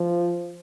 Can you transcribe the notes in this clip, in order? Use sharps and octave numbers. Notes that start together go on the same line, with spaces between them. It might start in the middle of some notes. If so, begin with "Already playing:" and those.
Already playing: F3